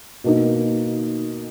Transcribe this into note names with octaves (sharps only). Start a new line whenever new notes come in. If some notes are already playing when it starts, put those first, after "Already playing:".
B2 A#3 D#4